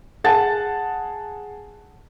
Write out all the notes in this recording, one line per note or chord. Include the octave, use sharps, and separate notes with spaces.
G#4 F#5 A5 A6